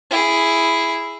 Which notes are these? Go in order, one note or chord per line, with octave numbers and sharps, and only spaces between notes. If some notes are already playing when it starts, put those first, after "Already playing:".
E4 G#4